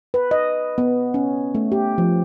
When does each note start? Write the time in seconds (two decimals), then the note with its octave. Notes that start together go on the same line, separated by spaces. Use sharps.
0.14 B4
0.31 D#5
0.78 B3
1.14 C#4
1.55 A3
1.72 G4
1.98 F3